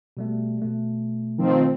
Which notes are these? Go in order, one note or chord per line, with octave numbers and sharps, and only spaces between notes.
B2 G3 A3
B2 A3
D#3 F3 C4